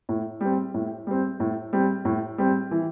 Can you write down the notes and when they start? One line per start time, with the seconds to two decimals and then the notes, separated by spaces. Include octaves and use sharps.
0.09 A2
0.41 G3 C4
0.74 A2
1.07 G3 C4
1.40 A2
1.73 G3 C4
2.05 A2
2.38 G3 C4
2.71 E3